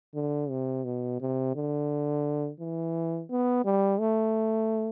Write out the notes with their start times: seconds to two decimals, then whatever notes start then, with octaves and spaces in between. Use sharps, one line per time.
0.15 D3
0.50 C3
0.84 B2
1.21 C3
1.55 D3
2.60 E3
3.31 B3
3.65 G3
4.00 A3